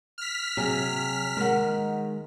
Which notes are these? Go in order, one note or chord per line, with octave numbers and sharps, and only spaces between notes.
F6 B6
C3 F#3 G#4
D#3 G#3 F#5